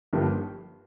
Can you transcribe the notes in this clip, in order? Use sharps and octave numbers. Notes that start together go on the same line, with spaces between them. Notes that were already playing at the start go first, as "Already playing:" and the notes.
G1 G2 F3 A#3 G4